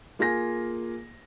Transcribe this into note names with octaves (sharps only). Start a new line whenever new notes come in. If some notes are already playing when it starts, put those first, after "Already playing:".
A#3 F4 G#4 G#5 A#6